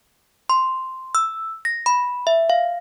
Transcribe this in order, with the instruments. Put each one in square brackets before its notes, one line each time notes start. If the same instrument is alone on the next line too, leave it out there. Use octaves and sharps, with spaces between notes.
[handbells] C6
E6
A#6
B5
E5
F5